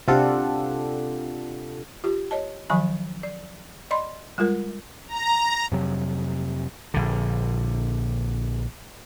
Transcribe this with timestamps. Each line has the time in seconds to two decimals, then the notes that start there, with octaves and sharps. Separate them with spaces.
0.08 C3 D4 F4 G4 A4 F#5
2.04 F4 G4
2.31 C#5 D#5 A5
2.70 D#3 F3 F#3 G#5 B5
3.23 D5
3.91 D5 D#5 B5 C6
4.38 G3 G#3 F4 A#4
5.08 A#5
5.72 F2 C3 F#3
6.94 A#1 D3